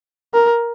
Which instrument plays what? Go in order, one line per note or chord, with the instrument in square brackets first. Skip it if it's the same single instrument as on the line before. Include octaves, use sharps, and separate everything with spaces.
[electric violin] A#4